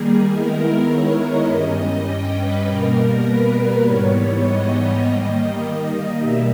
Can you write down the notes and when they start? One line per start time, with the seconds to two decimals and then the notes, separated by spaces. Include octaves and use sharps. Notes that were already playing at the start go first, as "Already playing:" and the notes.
Already playing: D#3 G3 A#3 G#4
0.30 D#3 G#3 B3 E4 A#4
0.89 C#5
1.19 D#5
1.47 G2 G3 C#4
2.05 G5
2.36 B4
2.64 B2 G3 A#3 A#4
3.24 B4
3.81 G#2 E3 G3 B3 C#5
4.40 D#5
4.99 D#3 G3 A#3 D#5
6.15 B2 G3 A#3 E5